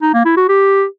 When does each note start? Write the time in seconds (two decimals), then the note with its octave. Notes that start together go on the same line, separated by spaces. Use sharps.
0.02 D#4
0.14 A#3
0.25 E4
0.37 F#4
0.49 G4